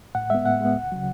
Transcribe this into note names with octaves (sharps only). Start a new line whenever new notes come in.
A2 F#5
G#3 B3 E5
A2 F#5
G#3 B3
C#2
C#3 F#3